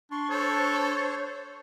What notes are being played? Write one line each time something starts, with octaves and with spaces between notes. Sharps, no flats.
D4 C6 C#6
A4 C5 C#5